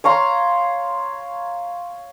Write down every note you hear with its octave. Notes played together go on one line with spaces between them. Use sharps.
C#5 F5 A#5 C6